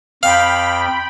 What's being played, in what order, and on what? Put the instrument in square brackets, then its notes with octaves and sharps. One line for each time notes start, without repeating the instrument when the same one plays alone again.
[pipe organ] F2 [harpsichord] F5 [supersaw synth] G5 B5